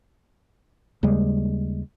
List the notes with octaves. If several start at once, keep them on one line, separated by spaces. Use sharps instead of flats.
D#2 C#3 G3 G#3